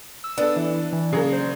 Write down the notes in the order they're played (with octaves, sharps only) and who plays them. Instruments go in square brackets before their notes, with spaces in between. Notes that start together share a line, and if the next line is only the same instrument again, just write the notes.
[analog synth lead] E6
[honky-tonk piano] B3 A4 [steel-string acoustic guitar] D4
[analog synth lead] E3
E3
[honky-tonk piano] C#3 F#3 A#3 [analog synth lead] G#4
[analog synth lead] C5